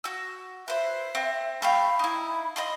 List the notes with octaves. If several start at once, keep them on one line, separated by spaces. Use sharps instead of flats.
F#4 E6
B4 C5 E5
C4
A3 G4 F5 B5
D#4 E4
D#5 B5 C6